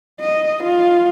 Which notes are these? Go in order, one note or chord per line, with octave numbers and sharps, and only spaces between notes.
D#5
F4